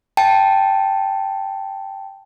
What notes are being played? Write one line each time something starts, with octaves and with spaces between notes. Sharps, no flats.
G5 A5